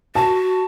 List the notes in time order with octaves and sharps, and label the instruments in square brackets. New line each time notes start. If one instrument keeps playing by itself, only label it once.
[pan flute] F#4 [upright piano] A5